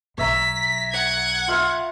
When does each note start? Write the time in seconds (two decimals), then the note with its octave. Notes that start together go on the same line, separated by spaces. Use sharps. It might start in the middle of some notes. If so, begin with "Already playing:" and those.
0.18 B1 C#5 E5 A#5 B6
0.92 F#5 G#6
1.48 F4 E5 F5